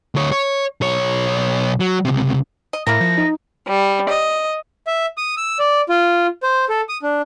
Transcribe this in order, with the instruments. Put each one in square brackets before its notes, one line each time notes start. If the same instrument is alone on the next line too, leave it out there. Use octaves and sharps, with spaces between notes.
[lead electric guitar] D2 C#5
C#5
B1 C#5
F#3
C#2 C3
[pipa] D#5
[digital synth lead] A2 [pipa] A#3 E4 A#4 [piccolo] A#6
[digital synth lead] F3
[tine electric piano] D#4
[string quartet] G3
D#5
[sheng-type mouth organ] E5
D#6
E6
D5
F4
C5
A4
D#6
D4